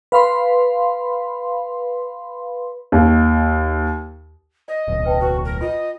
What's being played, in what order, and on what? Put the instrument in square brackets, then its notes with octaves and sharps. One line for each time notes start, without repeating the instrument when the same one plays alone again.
[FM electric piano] B4 F5 B5 C6
[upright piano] D#2
[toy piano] D5 [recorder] D#5
[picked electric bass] D1 B1
[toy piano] B4 G5 A5
[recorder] F#4 [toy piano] B4
[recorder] A#4
[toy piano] F4 C6 [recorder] D#5